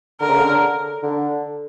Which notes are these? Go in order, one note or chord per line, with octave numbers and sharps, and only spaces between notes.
D3 A#4
C#3
D3
D3